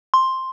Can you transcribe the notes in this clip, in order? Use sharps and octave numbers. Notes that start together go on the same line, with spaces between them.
C6